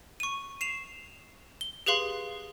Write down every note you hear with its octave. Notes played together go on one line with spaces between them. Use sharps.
C#6 D#7
C7 E7 F7
G7
G4 G#4 B4 F5 C6